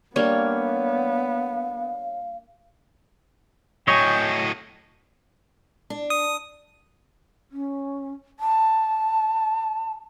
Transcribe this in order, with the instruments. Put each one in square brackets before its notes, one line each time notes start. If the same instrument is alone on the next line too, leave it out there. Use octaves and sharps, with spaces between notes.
[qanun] G3 A#3 D4 [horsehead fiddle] B3 [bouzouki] C#5 [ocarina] F5
[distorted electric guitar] A2 F#3 [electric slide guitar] C#5 [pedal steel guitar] D#5 G#5 [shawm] G5
[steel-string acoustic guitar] D4
[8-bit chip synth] D#6
[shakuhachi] C#4
A5